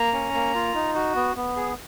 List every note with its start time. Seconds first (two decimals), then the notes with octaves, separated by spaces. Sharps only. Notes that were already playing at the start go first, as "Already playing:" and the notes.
Already playing: A#3 A#5
0.13 C#4
0.34 A#3
0.54 F4
0.75 D#4
0.95 F#4
1.15 B3
1.36 B3
1.56 G#4